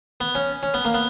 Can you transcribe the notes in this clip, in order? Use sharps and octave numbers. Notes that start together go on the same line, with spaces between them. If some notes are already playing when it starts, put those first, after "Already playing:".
B3
C#4
C#4
B3
A#3
B3